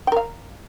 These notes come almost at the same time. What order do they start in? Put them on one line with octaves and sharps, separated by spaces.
G5 A#4 F5